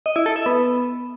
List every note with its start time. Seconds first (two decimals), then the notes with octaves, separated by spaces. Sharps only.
0.06 D#5
0.16 E4
0.26 A4
0.36 E5
0.46 B3